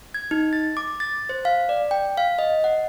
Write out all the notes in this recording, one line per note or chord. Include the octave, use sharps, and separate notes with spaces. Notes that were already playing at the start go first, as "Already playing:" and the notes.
G#6
D#4
A6
D6
A6
C5
F5
D5
G5
F5
D#5
F#5